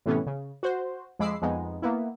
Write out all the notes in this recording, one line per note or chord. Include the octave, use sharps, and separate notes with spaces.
A2 C3 E3 A3 B3 C#4
C#3
F#4 C5
F2 G#3 B5 D6 E6 C7
F2 G#3 B3 D#4
A#3 B3 E4